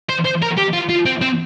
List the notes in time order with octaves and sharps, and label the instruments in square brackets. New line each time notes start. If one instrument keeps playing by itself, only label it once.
[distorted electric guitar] C5
C5
A#4
G4
F4
F4
C4
C4